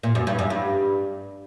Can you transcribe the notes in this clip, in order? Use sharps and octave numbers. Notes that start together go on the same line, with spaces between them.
A#2
F#2
G2
F#2
G2